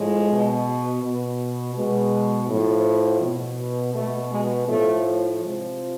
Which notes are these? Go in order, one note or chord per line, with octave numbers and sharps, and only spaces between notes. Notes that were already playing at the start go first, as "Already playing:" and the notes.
Already playing: A2 F3 G#3
B2
B2
B2 G#3
A2 F3
B2
B2 A3
G#3
A2 F3 A3
C3 F3 G#3